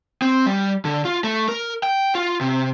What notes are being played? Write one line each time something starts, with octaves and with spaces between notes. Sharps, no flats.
C4
G3
D3
F4
A3
A#4
G5
F4
C3